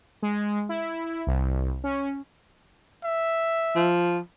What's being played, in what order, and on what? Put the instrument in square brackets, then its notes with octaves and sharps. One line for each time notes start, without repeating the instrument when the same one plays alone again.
[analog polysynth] G#3
E4
C2
C#4
[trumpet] E5
[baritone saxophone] F3